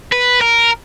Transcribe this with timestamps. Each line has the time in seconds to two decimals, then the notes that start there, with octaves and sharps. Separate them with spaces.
0.12 B4
0.41 A#4